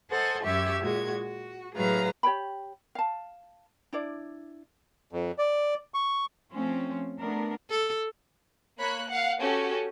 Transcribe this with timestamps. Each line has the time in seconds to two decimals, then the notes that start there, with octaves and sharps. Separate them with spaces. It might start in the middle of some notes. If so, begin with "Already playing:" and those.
0.11 A4 C5 D#5 F#5 G#5
0.43 F#2 G4 E5 C#6 E6 G#6
0.81 A#2 G#3 F#4 G#6
1.21 F#4
1.75 A2 F#3 G#4 B4 F5 A#5
2.23 G4 C#5 G5 B5
2.95 F5 A5
3.93 D4 E4 D5
5.13 F2
5.38 D5
5.94 C#6
6.52 F3 A3 C4 C#4
7.20 A3 B3 D4 A#4
7.70 A4
8.79 A#3 C#5 B5 F#6
9.10 F5 F#5
9.42 C#4 F#4 G4 A4